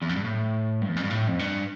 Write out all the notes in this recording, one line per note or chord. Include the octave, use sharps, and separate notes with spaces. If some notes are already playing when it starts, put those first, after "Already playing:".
E2
F2
G2
A2
G2
E2
F2
G2
A2
F2
G2